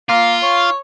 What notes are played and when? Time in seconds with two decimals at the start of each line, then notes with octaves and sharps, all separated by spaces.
0.09 A#3 F4
0.43 C#5